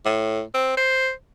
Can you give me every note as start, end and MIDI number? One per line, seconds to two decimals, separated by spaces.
0.06 0.42 45
0.54 0.76 60
0.77 1.11 72